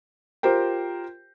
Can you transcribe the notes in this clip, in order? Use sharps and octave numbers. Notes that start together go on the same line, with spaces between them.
F4 G4 A#4 C5 G5